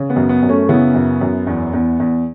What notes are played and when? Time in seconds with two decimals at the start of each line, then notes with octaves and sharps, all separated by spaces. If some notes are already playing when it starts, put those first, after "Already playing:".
Already playing: C#3
0.10 B3
0.16 F#2
0.29 B3
0.43 F#2
0.49 A3 C#4
0.69 C#3 B3 E4
0.95 F#2
1.21 F#2
1.47 E2
1.73 E2
2.00 E2